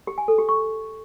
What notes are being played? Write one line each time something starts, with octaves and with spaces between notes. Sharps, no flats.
G4
G#5
A4
G4
C#6